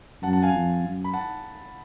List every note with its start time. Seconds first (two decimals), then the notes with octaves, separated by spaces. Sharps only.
0.23 F#2 F#5 A5
0.33 F#5 A5
0.43 F5 G#5
0.53 F2
0.83 F#2
1.04 B5
1.13 F#5 A5